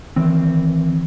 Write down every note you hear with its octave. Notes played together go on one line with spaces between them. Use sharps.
D#3 E3 C4